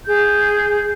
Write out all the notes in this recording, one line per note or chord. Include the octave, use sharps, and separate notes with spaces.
G#4 G6